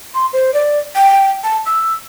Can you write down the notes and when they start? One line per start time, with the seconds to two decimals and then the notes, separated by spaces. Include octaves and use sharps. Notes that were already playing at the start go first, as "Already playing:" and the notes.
0.14 C6
0.33 C5
0.54 D5
0.95 G5
1.44 A5
1.66 E6